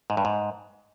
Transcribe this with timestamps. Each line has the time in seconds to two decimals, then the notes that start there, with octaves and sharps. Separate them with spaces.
0.10 G#2
0.17 G2
0.25 G#2